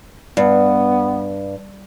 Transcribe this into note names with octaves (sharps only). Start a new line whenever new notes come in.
G2 B3